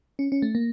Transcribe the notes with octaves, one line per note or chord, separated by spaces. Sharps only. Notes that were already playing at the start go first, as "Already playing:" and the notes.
C#4
C#4
A3
A#3